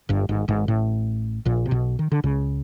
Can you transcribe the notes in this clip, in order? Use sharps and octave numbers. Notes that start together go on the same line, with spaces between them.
G1 G2
G#1 G#2
G#1 G#2
A1 A2
A#1 A#2
C3
B1 B2
D#3
D3
C#2 C#3